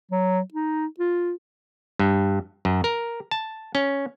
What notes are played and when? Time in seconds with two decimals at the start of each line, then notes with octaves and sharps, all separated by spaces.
0.11 F#3
0.54 D#4
0.99 F4
2.00 G2
2.65 F#2
2.84 A#4
3.31 A5
3.75 C#4